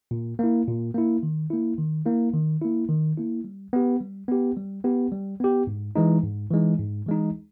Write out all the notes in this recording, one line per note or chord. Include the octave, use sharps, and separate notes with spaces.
A#2
A#3 E4
A#2
A#3 E4
D#3
A#3 E4
D#3
A#3 E4
D#3
A#3 E4
D#3
A#3 E4
G3
B3 G4
G3
B3 G4
G3
B3 G4
G3
B3 G4
G#2
E3 G#3 D#4
G#2
E3 G#3 D#4
G#2
E3 G#3 D#4